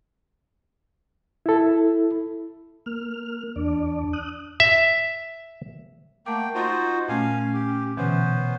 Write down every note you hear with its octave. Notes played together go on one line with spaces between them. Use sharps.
E4 A4
A#3 F6
E2 D4 D5
D#6 F#6
E5
A3 A#3 F#5 G5 A5 D6
D#4 F4 F#4 C5
A#2 A3 C#4 F5 G#5
G4
B2 D3 E3 B3 C#4 B4 C5